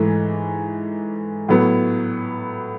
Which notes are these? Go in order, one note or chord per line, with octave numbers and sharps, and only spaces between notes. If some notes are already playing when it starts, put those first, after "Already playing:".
Already playing: G#2 E3 A3
A2 F#3 B3